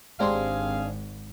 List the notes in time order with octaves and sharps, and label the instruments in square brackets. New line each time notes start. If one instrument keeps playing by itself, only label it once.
[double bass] G#1 [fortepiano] G#3 C6 [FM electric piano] C4 D4 G4 [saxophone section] G#4 F5